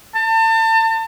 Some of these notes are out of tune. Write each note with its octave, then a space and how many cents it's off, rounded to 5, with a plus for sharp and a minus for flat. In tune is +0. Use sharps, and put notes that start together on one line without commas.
A5 +35